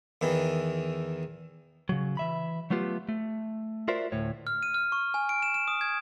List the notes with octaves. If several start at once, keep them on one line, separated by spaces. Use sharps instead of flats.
E2 D#3 E3
C#3 F#3
E3 E5 B5
F#3 A3 B3 F4 G4
A3
F4 F#4 A#4 C5 D5 E5
D2 A2 C#5
F6
D#7
F6
C#6
G#5
D7
E7
E7
D#6
G#6